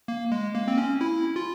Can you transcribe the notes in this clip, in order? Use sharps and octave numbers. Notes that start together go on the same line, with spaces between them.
A#3
G#3
A#3
C4
C#4
E4
F4